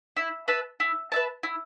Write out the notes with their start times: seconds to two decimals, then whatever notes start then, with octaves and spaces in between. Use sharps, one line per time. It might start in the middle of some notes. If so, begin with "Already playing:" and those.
0.16 E4
0.48 B4 E5 A5
0.80 E4
1.12 B4 E5 A5
1.43 E4